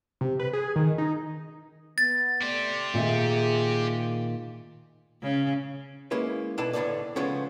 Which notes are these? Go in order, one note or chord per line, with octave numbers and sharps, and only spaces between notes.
C3
B4
G#4
D#3
D#4
B3 A6
A3 G4 C5 D5
A#2 D#3 G#4 E5
C#3
G#3 A#3 C#4 E4 B4
B2 D4 E4 A4 B4 A5
C2 A2 D3 A#3 B4 D5
C#3 F3 G#3 A3 B3 C#4